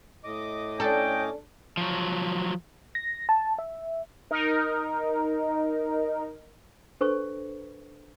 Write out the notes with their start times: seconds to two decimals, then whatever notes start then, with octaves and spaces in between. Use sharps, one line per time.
0.24 A2 D#5 D6
0.80 C#4 D4 A4 G5
1.77 F3 F#3
2.95 A#6
3.29 A5
3.59 E5
4.31 D#4 A#4
7.01 D4 A4 B4 C5 C#6